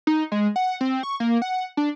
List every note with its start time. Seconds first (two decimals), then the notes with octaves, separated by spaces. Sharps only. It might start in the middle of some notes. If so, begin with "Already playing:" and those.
0.07 D#4
0.32 G#3
0.56 F#5
0.81 C4
1.03 C#6
1.20 A#3
1.42 F#5
1.77 D4